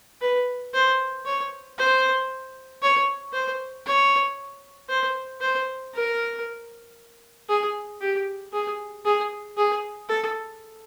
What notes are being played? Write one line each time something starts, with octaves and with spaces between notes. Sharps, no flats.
B4
C5
C#5
C5
C#5
C5
C#5
C5
C5
A#4
G#4
G4
G#4
G#4
G#4
A4